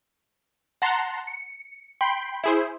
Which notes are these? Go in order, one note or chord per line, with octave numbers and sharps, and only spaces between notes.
F#5 A5 A#5 C6
C#7
G5 B5 C6
E4 G#4 C5